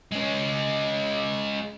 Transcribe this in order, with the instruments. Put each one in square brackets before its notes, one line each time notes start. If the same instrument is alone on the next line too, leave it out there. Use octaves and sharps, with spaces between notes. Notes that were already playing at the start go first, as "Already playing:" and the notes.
[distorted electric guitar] G#3 C#4